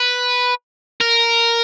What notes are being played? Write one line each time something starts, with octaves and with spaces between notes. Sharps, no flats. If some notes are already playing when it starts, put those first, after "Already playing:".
Already playing: B4
A#4